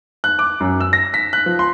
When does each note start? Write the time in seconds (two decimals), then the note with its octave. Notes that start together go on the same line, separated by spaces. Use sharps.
0.24 F#6
0.39 D6
0.60 F#2
0.81 E6
0.93 A#6
1.14 B6
1.33 F#6
1.46 F3
1.59 C6